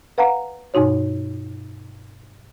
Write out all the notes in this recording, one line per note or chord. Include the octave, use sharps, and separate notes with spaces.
B4 F5 F#5 A#5
G2 B2 D#4 F#4 C#5